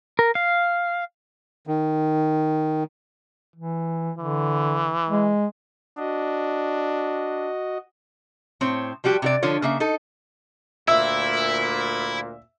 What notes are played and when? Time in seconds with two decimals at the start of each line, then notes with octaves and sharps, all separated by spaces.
0.19 A#4
0.35 F5
1.67 D#3
3.56 E3
4.18 D3 E3
5.09 G#3
5.98 D4 F#4 D#5
8.61 A2 C4 C#5
9.04 F3 G3 F#4 G4
9.22 C3 F#4 D5
9.43 D3 F3 F4 C#5
9.62 C#3 A#3 E5
9.80 D#4 A4
10.88 D2 A#2 E4 E5